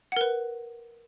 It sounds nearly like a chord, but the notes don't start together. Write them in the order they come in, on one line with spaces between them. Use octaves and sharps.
F#5 A#4 B4